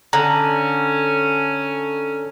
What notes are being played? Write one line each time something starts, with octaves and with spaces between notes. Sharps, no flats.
D3 C#4 A#5